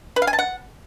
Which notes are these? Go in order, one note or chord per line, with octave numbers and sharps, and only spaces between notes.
B4
F5
G#5
A5
F#5